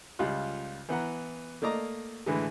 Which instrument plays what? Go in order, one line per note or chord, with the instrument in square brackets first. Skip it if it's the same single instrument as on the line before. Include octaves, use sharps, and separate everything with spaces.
[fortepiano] C#2 G3 F4 F#6
E3 B3 F#5 A#5
A3 A#3 D5 D#5 A#5
A2 D3 E3 G#3